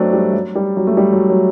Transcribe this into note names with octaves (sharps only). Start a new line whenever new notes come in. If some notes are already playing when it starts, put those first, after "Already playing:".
Already playing: F#3 A3 C4 D4
G3
F#3
G3
F#3
A3
G3
F#3
F#3